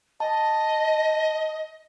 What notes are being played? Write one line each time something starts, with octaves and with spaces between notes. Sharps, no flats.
D#5 A5